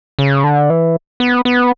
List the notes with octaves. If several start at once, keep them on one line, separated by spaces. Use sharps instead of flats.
C#3
D3
E3
B3
B3